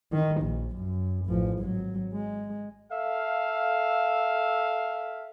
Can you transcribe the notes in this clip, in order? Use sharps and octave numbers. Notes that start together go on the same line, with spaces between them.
D#3
A#1
F#2
A1 F3
G#1 F#3
G#3
A4 E5 F5